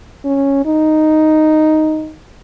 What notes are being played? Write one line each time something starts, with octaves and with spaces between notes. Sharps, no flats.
C#4
D#4